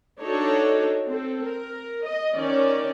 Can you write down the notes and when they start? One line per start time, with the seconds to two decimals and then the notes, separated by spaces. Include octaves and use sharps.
0.21 D4 D#4 F#4 A4 C#5
1.07 C4 A4
1.44 A#4
2.06 D#5
2.36 D#3 C#4 D5